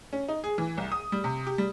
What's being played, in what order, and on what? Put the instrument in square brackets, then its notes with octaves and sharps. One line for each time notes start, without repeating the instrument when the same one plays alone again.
[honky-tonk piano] C#4
D#4
G#4
E3
C2
D#6
G3
C3
G4
G3